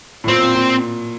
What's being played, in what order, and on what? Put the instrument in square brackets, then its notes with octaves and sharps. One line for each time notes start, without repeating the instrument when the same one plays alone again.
[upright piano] A2
[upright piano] A#2 [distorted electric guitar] C4
[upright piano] A#2
A#2